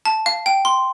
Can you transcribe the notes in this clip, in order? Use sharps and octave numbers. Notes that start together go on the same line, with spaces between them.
A5
F5
G5
C6